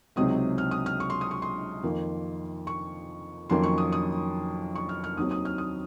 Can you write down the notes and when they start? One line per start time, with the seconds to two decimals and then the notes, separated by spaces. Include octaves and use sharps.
0.16 C#2 C3 F#3 C4 D#4 D#6
0.58 F6
0.71 D#6
0.86 F6
1.00 C#6
1.10 C6
1.21 D#6
1.31 C#6
1.42 C6
1.83 F2 D#3 A#3
2.67 C#6
3.50 F2 D#3 F#3 A#3 C#4 C6
3.63 C#6
3.78 D#6
3.92 D#6
4.75 C#6
4.89 F6
5.04 F6
5.17 D#2 D#3 F#3 C4 D#6
5.31 D#6
5.45 F6
5.58 D#6